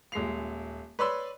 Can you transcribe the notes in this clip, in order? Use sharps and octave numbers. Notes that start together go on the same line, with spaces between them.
D#1 G#3 C7 F7
B4 C#5 D5 B5 C6 E6